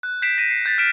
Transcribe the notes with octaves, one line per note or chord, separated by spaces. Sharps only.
F#6
G6 B6 C7 D7 E7
A#6 B6 D#7
C7
G6 A6 B6
F6 A6 B6 D7 E7